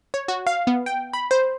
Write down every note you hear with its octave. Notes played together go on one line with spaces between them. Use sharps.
C#5
F#4
F5
B3
G5
B5
C5